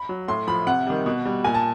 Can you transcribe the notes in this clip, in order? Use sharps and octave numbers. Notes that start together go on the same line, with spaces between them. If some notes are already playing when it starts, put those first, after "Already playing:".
Already playing: B5
F#3
A2 C6
F3 B5
C3 F#5
D#3 G3
B2
G3
A#2 G#5
A5